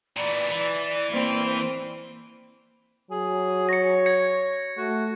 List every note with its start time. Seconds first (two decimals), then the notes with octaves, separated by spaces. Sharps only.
0.17 A#2 E3 D5
0.50 E3
1.10 A#3 C4
3.11 F#3 G#4
3.69 C#5 A#6 C#7
4.06 G#6 A#6 C#7
4.78 A3 F#4